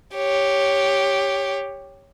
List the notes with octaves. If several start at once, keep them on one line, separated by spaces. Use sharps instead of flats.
G4 C#5